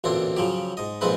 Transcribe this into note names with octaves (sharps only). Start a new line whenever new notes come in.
A1 D2 A#2 C4 D4
C#3 F3 F#3 G4
G#2 D#5
A#1 F2 G#2 G#3 C4 B4